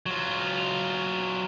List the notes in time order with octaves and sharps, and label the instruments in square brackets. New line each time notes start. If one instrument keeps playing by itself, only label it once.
[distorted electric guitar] F#3 F4